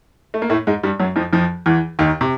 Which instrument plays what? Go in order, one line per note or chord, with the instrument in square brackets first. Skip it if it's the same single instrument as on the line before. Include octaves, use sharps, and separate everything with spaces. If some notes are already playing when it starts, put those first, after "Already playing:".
[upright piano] A3
A#3
A2 A3
G#2 G#3
G2 G3
F#2 F#3
F2 F3
F2 F3
E2 E3
D#2 D#3
C3